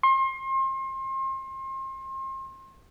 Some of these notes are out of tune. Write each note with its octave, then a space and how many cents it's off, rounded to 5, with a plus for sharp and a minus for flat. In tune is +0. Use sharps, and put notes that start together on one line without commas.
C6 +35